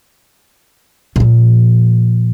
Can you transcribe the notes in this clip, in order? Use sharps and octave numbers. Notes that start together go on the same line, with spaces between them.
A#2 F3